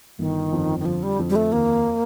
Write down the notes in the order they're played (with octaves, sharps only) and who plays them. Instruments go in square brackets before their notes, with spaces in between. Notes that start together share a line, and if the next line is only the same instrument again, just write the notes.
[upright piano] G1 [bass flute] D#3
[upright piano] F2
[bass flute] D#3
[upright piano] D3 [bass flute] F3
[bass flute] G3
[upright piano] F2
[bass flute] G3
A3
[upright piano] D#2 [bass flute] A#3